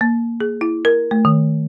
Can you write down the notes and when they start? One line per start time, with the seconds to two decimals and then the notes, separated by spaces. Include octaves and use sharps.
0.01 A#3
0.41 G#4
0.61 E4
0.85 A#4
1.11 A3
1.25 D#3